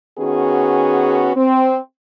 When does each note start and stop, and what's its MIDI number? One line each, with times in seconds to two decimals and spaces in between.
0.18 1.32 51
0.18 1.32 59
0.18 1.32 61
0.18 1.32 66
0.18 1.32 68
1.36 1.79 60